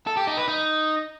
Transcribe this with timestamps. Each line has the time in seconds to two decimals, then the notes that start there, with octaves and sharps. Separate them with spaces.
0.07 A4
0.17 G4
0.27 D#4
0.37 B4
0.48 D#4